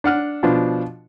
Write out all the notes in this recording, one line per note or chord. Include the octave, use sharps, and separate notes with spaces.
D4 F#5 F6
B2 F3 D4 F4